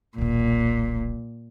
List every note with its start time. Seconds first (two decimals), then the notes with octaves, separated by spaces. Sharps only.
0.18 D#1 B1 A#2